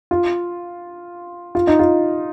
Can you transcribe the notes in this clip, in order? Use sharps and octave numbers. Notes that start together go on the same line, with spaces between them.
F4
F4
D#4
F4